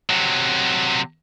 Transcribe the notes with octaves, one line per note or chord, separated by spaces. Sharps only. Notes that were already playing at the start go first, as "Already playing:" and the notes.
C3 F#3